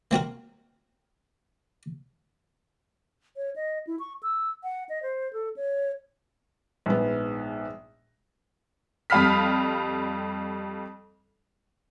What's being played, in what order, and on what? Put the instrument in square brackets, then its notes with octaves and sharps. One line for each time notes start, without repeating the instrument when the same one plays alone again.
[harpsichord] A#3 C4 F#4 A#4
[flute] C#5
D#5
E4
C#6
E6
F#5
D#5
C5
A4
C#5
[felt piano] A#1 G#2 B3
[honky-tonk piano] F2 G3 F5 B5 F6 B6